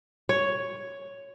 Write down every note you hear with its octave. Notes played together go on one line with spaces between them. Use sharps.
C#5